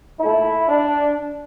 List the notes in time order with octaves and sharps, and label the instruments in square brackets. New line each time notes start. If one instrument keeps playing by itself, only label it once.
[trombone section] A#2 A3 E4
D4